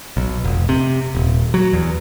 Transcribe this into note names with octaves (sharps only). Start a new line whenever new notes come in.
B1
F1
C3
D#1
F#3
E2